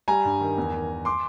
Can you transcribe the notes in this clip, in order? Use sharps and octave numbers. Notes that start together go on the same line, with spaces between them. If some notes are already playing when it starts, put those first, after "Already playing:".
G3 G#5 A#5
G2
D#3
E2
D#3
D#3
C6 D6